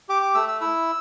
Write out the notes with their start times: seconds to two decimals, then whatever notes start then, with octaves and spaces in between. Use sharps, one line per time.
0.09 G4 D6
0.22 D6
0.35 A3 E6
0.48 E6
0.61 E4 E6